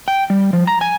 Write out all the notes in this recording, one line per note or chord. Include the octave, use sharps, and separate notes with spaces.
G5
G3
F3
A#5
G#5